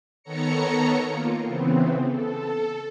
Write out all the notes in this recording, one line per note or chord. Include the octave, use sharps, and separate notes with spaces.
D#3 B3 A4 C#5 A#5 C#7
A#3 F4
C#3 E3 B3 C4
A4